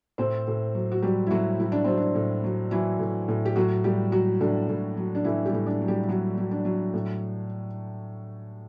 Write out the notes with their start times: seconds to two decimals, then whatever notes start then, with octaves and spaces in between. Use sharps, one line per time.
0.18 A2 C4 C5
0.47 A2
0.75 F#3
0.92 F#4
1.02 F#3 G3 G4
1.27 E4
1.31 A2 F#3 F#4
1.59 A2 E4
1.72 D4
1.84 F#3 C4
1.97 D4
2.15 A2
2.44 F#3
2.71 E3 F#3 E4
2.99 A2
3.28 A2
3.45 G4
3.56 A2 F#3 F#4
3.84 A2 G3 G4
4.12 F#3 F#4
4.41 A2 D4
4.69 A2
4.97 F#3
5.15 D4
5.24 A2 E3 E4
5.45 G3 G4
5.53 A2
5.66 D4 D5
5.82 F#3
5.88 G3 G4
6.09 F#3 F#4
6.38 F#3
6.51 D4
6.65 F#3
6.94 A2